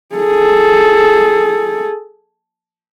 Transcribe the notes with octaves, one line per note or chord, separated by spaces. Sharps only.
G#4 A4